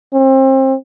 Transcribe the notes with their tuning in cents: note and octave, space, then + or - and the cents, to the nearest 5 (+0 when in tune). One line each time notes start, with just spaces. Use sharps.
C4 +30